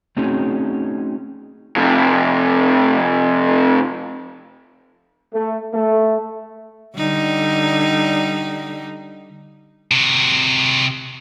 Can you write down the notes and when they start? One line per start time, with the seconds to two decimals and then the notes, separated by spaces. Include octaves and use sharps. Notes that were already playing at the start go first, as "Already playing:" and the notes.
0.17 A3 C4 C#4 D#4 F#4 G#4
1.76 F2 C3
5.34 A3
5.72 A3
6.96 D3 G3 D#4
9.91 C3 F#4